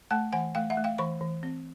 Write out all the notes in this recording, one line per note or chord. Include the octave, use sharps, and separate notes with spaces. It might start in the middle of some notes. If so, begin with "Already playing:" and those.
A3 G5 A5
E3 F#5 G#5
A3 F5 G5
E5 F#5
A3
F5 G5
E3 B5 C#6
E3
C4